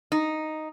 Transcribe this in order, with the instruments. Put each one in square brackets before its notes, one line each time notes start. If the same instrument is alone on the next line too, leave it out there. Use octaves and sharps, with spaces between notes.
[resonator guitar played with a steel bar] D#4